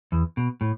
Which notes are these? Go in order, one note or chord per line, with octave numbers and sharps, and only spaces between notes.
E2
B2
A2